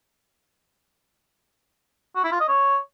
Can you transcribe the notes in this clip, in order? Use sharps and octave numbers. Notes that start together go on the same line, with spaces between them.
F#4
E4
F4
D#5
C#5